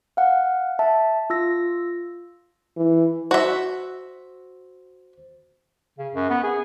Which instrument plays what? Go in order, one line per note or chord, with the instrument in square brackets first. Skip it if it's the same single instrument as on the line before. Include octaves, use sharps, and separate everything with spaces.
[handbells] F5 F#5
E5 A5
F4 E6 A#6
[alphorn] E3
[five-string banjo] F#4 E5 [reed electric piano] C5
[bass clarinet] C#3
F#2
B3
G#4